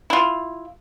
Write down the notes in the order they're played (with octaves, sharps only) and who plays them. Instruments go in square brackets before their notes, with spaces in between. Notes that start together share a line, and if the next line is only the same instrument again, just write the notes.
[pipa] E4 F4